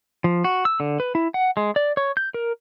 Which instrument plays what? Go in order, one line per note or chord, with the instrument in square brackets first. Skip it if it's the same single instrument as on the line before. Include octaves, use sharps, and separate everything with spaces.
[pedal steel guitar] F3
F#4
E6
D3
B4
E4
F#5
G#3
D5
C#5
G6
A#4